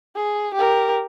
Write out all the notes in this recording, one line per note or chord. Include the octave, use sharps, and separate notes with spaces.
G#4
G4 A#4